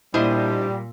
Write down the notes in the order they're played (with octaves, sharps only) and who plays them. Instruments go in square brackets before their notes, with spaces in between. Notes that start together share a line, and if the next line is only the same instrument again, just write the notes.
[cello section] A#2 [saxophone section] G3 [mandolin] D4 C5 D#5 [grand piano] E4